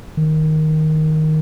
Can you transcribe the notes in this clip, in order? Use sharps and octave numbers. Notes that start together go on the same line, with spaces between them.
D#3